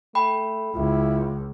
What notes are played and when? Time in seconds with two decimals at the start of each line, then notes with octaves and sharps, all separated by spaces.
0.15 A3 G5 B5
0.74 C#2 E4 F4